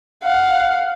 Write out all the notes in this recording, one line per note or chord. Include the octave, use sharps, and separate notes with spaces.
F5 F#5